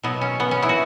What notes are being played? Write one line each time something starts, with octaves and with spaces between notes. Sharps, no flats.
B2 F#3 B3
C#4
B3
C#4
B3 E4
F#4